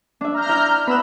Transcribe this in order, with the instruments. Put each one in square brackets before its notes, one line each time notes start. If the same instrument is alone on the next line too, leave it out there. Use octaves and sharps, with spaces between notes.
[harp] D4 E5
[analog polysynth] A#5 F6 G6
[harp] E4 E5
[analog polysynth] B3 E7 [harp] B5 E6 F#6